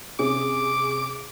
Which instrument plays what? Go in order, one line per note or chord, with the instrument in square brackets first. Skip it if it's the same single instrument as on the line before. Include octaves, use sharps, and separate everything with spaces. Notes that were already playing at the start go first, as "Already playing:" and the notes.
[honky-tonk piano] C3 C#4 G#4 [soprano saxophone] D6